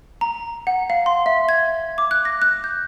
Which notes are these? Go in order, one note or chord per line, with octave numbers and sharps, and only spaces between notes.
A#5
F#5
F5
C6
E5
G#6
D6
F#6
A#6
F#6
G6